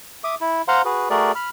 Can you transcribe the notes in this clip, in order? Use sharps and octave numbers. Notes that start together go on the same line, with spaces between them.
E5 D6 D#6
E4
C5 F5 F#5 A#5 C6
F#4 G#4 B4
A3 F#4 G#4 A#4 D5
B5 F6